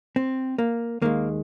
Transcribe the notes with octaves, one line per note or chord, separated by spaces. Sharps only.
C4
A#3
D#2 D#3 G#3 A#3